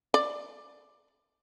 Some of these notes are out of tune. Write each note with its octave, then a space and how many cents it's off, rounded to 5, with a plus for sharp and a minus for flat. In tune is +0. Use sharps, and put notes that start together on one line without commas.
D5 +10